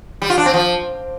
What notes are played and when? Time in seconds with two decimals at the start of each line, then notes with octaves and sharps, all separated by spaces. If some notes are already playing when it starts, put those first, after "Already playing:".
0.22 G3
0.30 F4
0.38 D4
0.46 C4
0.54 F3